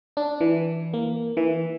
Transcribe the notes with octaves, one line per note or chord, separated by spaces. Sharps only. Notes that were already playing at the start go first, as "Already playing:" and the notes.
D4
E3
A#3
E3